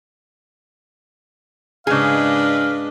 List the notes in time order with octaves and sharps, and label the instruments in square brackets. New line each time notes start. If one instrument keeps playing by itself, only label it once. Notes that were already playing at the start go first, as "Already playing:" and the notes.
[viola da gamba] G#2 B4 D#5 [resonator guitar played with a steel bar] C#3 G#4 [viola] D4 [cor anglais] F5